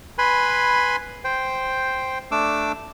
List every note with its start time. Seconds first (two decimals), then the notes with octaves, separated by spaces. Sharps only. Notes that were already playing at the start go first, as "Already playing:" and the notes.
0.18 B4 G#5 B5 C6
1.24 C5 G5
2.31 A3 D4 D6 E6